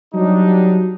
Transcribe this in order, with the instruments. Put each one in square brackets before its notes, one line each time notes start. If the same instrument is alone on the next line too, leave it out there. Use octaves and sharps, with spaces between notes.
[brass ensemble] F#3 G3 D4 D#4